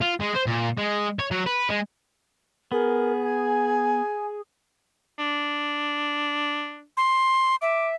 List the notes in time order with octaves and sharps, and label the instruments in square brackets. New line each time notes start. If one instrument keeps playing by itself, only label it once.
[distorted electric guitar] F4
G#3
C5
A#2
G#3
C#5
F#3
B4
G#3
[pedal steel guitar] B3 [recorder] G#4 [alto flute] A#4
[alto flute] G#5
[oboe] D4
[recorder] C6
[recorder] E5 [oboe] D6